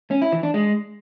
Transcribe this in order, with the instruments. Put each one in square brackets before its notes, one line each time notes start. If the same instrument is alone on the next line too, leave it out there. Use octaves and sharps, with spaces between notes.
[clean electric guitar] C#4
E4
E3
D4
G#3